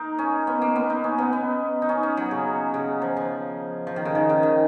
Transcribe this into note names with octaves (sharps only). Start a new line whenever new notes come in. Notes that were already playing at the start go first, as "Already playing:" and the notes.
Already playing: A#3 D#4
C#4
B3
A#3
B3
D#4
C#4
B3
B3
D#4
C#4
C#4
F#3
C#3
C#3
F3
F3
F3
D#3
C#3
D#3
C#3
D#3